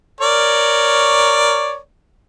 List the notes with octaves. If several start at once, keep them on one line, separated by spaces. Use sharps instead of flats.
A#4 C#5 D5